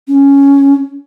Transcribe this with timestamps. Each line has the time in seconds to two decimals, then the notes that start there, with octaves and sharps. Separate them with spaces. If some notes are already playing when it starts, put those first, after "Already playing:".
0.08 C#4